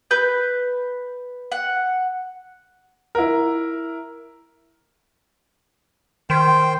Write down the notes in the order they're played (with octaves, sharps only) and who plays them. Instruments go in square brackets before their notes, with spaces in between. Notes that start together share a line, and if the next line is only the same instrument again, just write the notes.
[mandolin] B4 G6
F#5
[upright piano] E4 A#4
[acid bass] D#3 [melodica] C5 G5